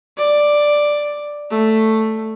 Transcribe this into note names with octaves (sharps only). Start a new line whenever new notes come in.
D5
A3